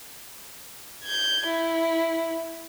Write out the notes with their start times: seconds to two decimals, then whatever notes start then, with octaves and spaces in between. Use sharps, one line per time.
1.03 G6 G#6
1.46 E4